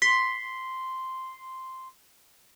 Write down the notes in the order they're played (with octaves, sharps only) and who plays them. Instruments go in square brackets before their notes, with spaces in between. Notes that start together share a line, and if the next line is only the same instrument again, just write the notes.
[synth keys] C6 [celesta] B6